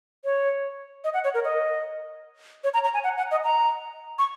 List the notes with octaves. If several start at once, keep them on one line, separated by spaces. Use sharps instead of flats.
C#5
D#5
F#5
C#5
A#4
D#5
C#5
A#5
A#5
G#5
F#5
F#5
D#5
A#5
C#6